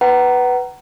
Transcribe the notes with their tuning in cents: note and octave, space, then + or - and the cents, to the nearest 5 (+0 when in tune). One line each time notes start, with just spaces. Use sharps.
B4 +0 F#5 +30 A#5 +0